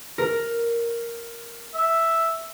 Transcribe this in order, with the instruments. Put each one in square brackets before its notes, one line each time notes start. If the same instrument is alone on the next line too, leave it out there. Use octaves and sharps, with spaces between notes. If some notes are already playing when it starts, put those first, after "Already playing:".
[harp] A#4
[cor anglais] E5